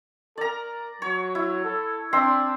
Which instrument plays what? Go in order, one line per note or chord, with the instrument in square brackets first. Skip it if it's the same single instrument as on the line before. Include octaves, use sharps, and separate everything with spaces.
[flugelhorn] A#4 [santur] D5 A#5
[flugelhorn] F#3 [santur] C#5
[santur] E4
[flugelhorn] A4
[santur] C4 E5 C6 [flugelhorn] D4